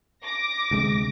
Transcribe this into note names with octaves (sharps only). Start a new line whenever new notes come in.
D6 A#6
D2 C3 G#3